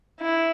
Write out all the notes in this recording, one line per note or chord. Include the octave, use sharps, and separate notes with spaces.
E4